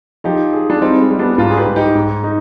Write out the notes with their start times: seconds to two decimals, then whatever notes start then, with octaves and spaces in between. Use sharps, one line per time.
0.24 F3 D#4 G4
0.53 G#4
0.70 D4
0.81 G3 C4 D#4
1.01 G#3
1.10 G3
1.19 B3 D4
1.38 G#2 D4 F4
1.50 G#4
1.57 G4 B4
1.66 G#2
1.76 D#4 G4
1.95 G#2
2.24 D#4